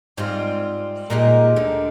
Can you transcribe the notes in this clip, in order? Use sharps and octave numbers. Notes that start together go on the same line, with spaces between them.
G#2 G3 C4 F4
A#2 G#3 D#4 G4 A#4
D2 D3